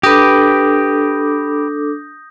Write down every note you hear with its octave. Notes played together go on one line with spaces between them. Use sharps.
D4 G4 A4 B4 D6 D#6 G6 A#6